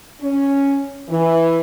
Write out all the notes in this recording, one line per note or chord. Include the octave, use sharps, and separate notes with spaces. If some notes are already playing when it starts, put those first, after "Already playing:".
C#4
E3